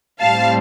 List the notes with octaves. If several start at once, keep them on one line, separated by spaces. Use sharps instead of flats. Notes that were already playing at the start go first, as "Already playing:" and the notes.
A2 G3 C4 F5 A5